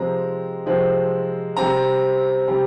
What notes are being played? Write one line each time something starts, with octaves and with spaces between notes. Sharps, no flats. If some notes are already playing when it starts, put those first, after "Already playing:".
Already playing: C3 F3 G#3 C4 A#5
C3 F3 G#3 C4
C3 G3 C4 A#5
C3 G3 C4